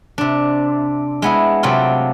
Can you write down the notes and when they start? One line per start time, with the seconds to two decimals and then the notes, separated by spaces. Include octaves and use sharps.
0.18 C3 D4
1.22 G#3 B3 E4
1.63 C3 F#3 A3 C4 F4